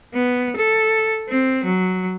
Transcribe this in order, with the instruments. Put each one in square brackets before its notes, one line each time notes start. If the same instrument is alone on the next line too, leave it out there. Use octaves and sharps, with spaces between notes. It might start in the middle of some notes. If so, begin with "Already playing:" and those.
[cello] B3
A4
C4
F#3